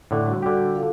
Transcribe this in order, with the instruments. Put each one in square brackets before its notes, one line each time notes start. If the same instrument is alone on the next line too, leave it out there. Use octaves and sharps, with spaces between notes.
[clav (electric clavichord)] A2 D3
[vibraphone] G3 F#4
[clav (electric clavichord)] D3 G4
[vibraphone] F4 A4 F5